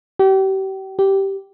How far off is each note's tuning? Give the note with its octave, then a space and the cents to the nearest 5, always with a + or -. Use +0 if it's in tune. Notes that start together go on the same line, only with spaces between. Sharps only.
G4 -35
G4 -10